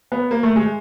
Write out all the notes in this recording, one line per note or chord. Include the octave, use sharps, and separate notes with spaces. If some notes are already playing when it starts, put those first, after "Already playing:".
B3
A#3
A3
G#3